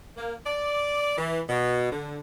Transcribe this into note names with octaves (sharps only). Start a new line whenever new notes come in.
A#3
D5
E3
B2
D3